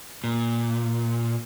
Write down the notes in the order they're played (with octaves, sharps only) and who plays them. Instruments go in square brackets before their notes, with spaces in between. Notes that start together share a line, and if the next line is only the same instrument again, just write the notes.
[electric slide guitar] A#2